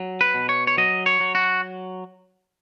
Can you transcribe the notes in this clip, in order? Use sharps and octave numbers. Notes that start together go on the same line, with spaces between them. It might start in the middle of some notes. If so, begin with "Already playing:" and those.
Already playing: F#3
B4
B2
C#5
C#5
F#3 D#5
C#5
F#3
F#4